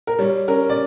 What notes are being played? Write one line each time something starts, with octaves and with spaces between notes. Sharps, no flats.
A#4
G3 C#5
C#4 A#4
D5